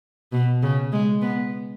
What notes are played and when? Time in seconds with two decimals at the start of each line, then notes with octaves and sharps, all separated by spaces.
0.32 B2
0.63 C#3
0.93 G#3
1.22 B3